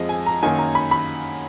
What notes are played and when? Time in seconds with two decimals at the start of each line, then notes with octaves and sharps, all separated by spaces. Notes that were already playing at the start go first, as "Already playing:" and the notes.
Already playing: F2 F3 G#3 D#5
0.09 G#5
0.26 A#5
0.42 F#2 D#3 A#3 G#5
0.59 A#5
0.75 B5
0.91 B5